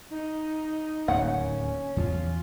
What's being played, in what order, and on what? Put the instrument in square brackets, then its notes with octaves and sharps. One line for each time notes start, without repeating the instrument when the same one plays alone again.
[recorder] D#4
[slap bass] D1 D#2 A#3 [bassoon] C#4 [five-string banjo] F#5
[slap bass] E2 [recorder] F4